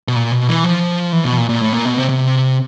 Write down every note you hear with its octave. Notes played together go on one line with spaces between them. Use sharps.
B2
A#2
B2
E3
F3
E3
B2
A#2
A#2
A2
A#2
B2
C3
C3